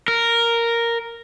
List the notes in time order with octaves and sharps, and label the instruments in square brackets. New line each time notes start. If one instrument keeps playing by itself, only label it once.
[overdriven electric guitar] A#4